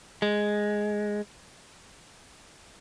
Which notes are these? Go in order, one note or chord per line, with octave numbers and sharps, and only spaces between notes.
G#3